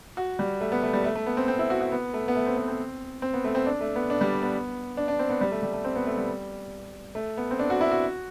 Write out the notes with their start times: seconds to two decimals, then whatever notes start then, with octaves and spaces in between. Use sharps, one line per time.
0.17 F#4
0.39 G3
0.61 A3
0.72 B3
0.83 A3
0.93 G3
1.04 A3
1.15 A3
1.26 B3
1.37 C4
1.48 C4
1.59 E4
1.70 F#4
1.81 F#4
1.92 B3
2.14 A3
2.28 B3
2.35 A3
2.47 C4
2.57 B3
2.68 C4
3.22 C4
3.33 B3
3.44 A3
3.55 C4
3.66 D4
3.81 A3
3.95 B3
4.10 D4
4.21 G3
4.43 B3
4.97 D4
5.08 D4
5.19 C4
5.30 B3
5.41 G3
5.52 A3
5.63 G3
5.73 A3
5.85 C4
5.95 B3
6.06 A3
6.17 G3
7.15 A3
7.37 B3
7.51 C4
7.59 D4
7.70 F#4
7.81 E4
7.91 F#4